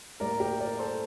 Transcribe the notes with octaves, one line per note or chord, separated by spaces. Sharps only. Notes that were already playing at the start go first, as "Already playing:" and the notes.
A2 G3 A#3 A#4 D5
G4 A#4
A#4 D5
A4 C5